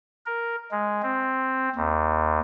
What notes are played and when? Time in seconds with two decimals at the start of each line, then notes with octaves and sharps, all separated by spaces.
0.26 A#4
0.71 G#3
1.02 C4
1.76 D#2